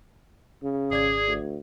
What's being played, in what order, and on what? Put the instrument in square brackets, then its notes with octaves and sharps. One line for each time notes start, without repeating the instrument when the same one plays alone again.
[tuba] C#3
[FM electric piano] G#1 D5 G#6 [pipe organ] G#4
[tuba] D2